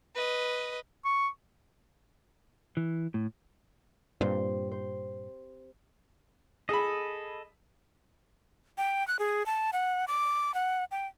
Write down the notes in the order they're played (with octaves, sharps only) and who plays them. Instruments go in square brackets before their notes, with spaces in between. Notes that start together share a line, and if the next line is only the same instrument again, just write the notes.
[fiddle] B4 D#5
[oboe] C#6
[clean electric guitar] E3
A2
[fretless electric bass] G2 A#2 [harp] C4 G4 C5
[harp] C5
[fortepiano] G#4 B5 [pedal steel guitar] A4 D#5
[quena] G5
F#6
G#4
A5
F#5
D6
F#5
G5